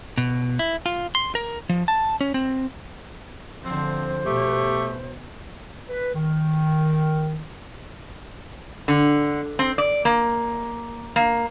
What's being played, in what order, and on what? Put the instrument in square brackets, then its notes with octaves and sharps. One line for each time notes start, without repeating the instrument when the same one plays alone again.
[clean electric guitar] B2
E4
F4
C6
A#4
F3
A5
C#4
C4
[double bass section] D3 F3 [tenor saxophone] C4 [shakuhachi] C5
[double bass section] B2 [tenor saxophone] A3 [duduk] G4
[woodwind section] B4
D#3
[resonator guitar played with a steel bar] D3
C4
D5
A#3
A#3